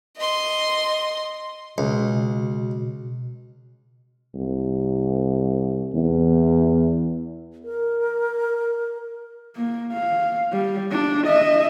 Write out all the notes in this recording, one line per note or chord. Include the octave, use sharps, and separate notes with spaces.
D#5 C6
C#2 B2
C2
E2
A#4
A#3
F5
G3
D4
D#5 E5